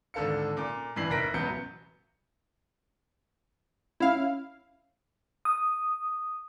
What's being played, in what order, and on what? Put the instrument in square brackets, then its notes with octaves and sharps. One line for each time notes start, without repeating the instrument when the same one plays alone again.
[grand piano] G#1 D3 A4 F5 C#7
A#2 D6
G2 E3 G3 C7 F#7
F1 A#4 F#6 A#6 B6 D7
E1 A1 F#3 B3 G6 C#7
[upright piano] C#4 [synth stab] E4 F5
[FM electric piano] D#6